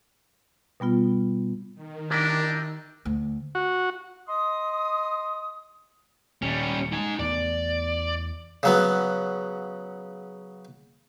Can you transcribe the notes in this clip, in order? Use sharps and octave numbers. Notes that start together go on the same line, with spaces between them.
B2 G3 B3 F4
D#3
D4 E4 G4 A#4
D2
F#4
D#5 C6 D#6
D#1 G3 C#4
D#4 G#5
E2 A3 B3 D5
C#3 F#3 B3